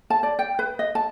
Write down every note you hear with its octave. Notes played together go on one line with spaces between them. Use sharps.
A5
D5
G5
B4
D#5
A5